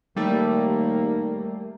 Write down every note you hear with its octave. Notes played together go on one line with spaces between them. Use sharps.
D#2 G3 A3 A#3